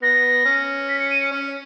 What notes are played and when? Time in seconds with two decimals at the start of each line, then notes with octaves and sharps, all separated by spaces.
0.02 B3 A#6
0.45 C#4
0.89 B6
1.00 C#7
1.10 D#7
1.21 C#7
1.32 C#4